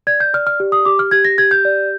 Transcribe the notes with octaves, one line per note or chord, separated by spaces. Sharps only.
D5 G#6
G6
D5 F6
F6
G4
D#6
G4 D6
F6
G4 G#6
A#6
G4 G#6
G6
D5